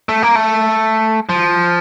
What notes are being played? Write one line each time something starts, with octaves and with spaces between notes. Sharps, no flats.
A3
A#3
A3
F3